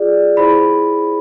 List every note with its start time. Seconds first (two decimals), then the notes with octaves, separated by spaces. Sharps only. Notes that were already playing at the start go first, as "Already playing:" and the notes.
Already playing: F4 G#4 D5
0.37 E4 G#4 C5 B5